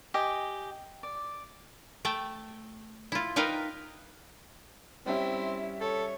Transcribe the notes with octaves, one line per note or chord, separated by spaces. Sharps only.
G4 D#5 G#5
D5
A3 G5 A5
E4 F4
D#4 A#4 B4 F5 G5
G3 C4 C#4 E4 E5
A4 C#5